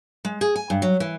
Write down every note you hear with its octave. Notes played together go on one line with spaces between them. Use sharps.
G#3
G#4
G#5
G2
F#3
E3